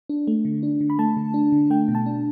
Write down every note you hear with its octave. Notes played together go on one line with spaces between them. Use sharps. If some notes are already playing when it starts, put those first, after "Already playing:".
D4
A3
D3
D4
D3
B5
A3 A5
D3
D4
D3
A3 G5
B2
A5
D4